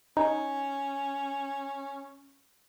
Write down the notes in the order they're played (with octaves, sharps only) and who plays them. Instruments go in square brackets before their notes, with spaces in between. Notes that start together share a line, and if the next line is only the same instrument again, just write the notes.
[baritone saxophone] C#4 [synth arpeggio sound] D#4